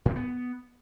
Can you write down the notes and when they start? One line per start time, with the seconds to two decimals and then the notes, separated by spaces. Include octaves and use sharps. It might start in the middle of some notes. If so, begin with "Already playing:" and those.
0.05 A2
0.11 C4
0.16 B3